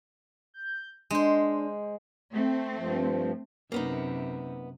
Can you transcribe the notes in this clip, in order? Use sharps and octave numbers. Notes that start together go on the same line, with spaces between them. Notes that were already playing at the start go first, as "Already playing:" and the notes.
G6
G#3 D4 C5
A3 C4
G2 F3
F#2 C3 A#3 B3 D#4